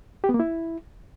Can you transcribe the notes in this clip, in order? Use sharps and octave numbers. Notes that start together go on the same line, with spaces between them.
G4
B3
A#3
E4